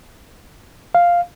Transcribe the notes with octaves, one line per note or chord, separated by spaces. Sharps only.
F5